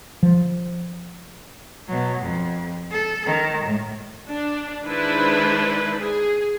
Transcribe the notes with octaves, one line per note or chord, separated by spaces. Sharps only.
F3
B2 F#3
F2
A4
D#3
A2
D4
D#3 G#3 D4 E4 B4 C5
G#4